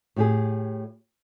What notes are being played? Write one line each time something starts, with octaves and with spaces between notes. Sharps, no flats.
A2 G4 G#4